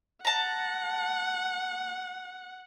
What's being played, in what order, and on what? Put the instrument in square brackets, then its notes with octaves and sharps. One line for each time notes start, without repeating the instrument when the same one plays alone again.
[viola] F#5 [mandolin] A5 A#5